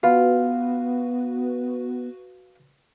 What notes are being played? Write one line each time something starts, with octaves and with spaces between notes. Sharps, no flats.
B3 F4 F#4 B4